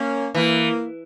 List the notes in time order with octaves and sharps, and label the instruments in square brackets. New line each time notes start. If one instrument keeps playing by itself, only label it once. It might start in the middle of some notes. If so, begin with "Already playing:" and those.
Already playing: [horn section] A#3 C#4
[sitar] E3 [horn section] A#3